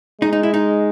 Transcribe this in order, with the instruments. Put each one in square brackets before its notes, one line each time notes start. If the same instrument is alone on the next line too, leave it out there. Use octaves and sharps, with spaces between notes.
[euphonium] G#3 [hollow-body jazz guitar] D#4
[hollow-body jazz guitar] D#4
E4
D#4